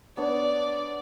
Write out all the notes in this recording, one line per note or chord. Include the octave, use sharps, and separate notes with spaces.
B3 D4 C#5 D5